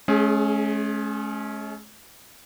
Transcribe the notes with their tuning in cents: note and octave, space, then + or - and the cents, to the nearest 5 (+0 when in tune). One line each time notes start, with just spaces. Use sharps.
G#3 +45 C#4 -5 G#4 +0